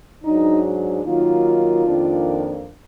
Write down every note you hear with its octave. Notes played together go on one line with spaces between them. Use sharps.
G#2 F#3 D4 D#4
D#3 F#3 A#3 D#4 F4
F2 D#3 A#3 D4